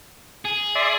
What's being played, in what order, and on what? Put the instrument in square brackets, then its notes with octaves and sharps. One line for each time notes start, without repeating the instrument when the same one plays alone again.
[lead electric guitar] G#4
[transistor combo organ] D5 E5 C6